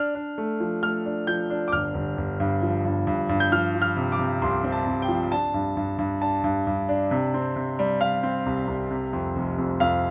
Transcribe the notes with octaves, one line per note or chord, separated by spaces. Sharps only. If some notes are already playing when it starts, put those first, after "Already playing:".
Already playing: D4 F6
D4
A3
F3
A3 F6
D4
F3 G6
D4
D6
G1 F6
G1
G1
G2
F3
G2
G2
G2
G6
F3 F6
F3
F6
C3
D6
C3
C2 C6
C4
A5
C2
G5
F3
D4 A5
G2
G2
G2
D4 A5
G2
G2
D4
C3
C4
C3
G3
G3 F5
C4
C2
C2
C3
F2
F1
F2
F2 F5